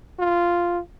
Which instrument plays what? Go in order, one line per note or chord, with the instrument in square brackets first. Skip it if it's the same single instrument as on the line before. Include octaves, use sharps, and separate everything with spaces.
[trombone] F4